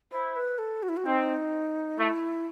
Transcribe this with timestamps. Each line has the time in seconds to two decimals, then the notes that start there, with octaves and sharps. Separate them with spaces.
0.12 E4 C5
0.36 B4
0.58 A4
0.83 F#4
0.89 E4
0.97 F#4
1.05 C4 D#4
1.98 A3 E4